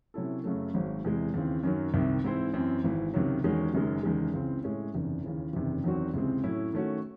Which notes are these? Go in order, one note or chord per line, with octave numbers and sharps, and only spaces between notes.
C3 F#3 C#4 E4 A4
F#2 C#3 F#3 A3
G#1 G#2 F#3
E2 C3 E3 G#3
D#2 C#3 E3 C4
F#2 D#3 F#3
C2 C3 D#3
G#2 E3 C4 E4 C5
F#2 E3 C4
G#1 G#2 E3
C#2 C3 D#3 F#3
E2 D#3 G#3 C#4 F#4
F#1 F#2 D#3 G#3
F#1 E2 D#3 G#3
C#2 C#3 E3 C4
A2 G#3 C#4
F#1 E2 C3 D#3
D#2 C#3 E3
F#1 E2 C3 D#3
E2 D#3 F#3 C4 F#4
C#2 C3 E3 G#3 C4
A2 F#3 C#4 E4
D#3 A3 C#4 F#4